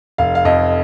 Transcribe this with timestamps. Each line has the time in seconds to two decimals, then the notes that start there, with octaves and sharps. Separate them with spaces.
0.18 F1 F5
0.35 F5
0.45 F2 D#5